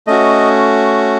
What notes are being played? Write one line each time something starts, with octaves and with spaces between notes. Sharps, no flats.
A3 C#4 F#4 D#5